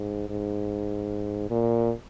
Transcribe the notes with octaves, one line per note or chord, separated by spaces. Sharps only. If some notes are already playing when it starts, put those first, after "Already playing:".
Already playing: G#2
G#2
A#2